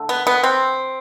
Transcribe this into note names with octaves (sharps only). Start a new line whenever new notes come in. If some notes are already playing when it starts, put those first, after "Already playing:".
Already playing: D3 A3
B3
B3
C4